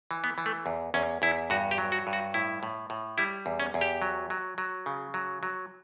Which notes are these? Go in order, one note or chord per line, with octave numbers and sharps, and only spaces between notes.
E3
B3
E3
A3
E2
E2 C#4
E2 E4
G2 F#4
G4
F#3
F#4
G2
F#4
A2 E4
A2
A2
G3 E4
E2
C#4
E2
G4
F#3
F#3
F#3
C#3
F#3
F#3